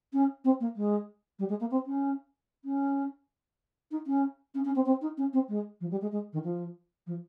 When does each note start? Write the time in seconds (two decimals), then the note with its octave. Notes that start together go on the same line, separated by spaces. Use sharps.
0.13 C#4
0.44 C4
0.60 A#3
0.76 G#3
1.39 G3
1.49 G#3
1.60 A#3
1.71 C4
1.86 C#4
2.65 C#4
3.91 D#4
4.07 C#4
4.54 C#4
4.65 C#4
4.76 C4
4.86 C4
5.01 D#4
5.18 C#4
5.33 C4
5.49 G#3
5.81 F3
5.91 G3
6.01 G#3
6.12 G#3
6.33 D#3
6.44 F3
7.07 F3